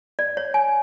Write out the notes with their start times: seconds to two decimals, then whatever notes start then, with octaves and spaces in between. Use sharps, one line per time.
0.19 D5
0.37 C#5
0.54 G#5